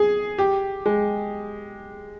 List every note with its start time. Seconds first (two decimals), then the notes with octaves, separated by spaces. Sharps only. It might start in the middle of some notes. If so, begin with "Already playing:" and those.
Already playing: G#4
0.38 G4
0.86 G#3